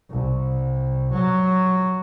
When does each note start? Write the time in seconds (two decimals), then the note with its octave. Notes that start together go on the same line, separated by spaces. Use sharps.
0.10 C2
1.12 F#3